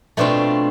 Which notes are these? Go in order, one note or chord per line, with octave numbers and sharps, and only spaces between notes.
B2 A3 C4 D4 F4